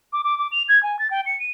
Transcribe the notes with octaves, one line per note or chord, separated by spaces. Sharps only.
D6
D6
D6
F7
G#6
G#5
A6
G5
C#7
D#7